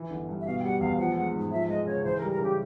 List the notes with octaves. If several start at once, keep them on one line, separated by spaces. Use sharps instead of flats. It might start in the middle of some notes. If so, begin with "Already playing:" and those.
Already playing: E3
G1
G2
E5
B2 F5
G5
G3 F#5
E2 F5
F3 F#5
G#3 F#5
G#2
F3 E5
G#3 D#5
C#3 C#5
E3 C5
A#4
G3
A#4
C#3 G4